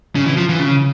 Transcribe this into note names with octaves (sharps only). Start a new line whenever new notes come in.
C#3
E3
F3
E3
C#3